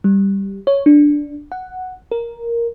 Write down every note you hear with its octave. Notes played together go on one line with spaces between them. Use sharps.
G3
C#5
D4
F#5
A#4